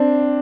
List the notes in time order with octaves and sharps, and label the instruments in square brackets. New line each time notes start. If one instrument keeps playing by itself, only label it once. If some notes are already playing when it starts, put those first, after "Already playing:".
Already playing: [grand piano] C4 D4